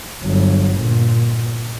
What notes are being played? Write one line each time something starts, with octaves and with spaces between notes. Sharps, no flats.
G1 F#3
A#2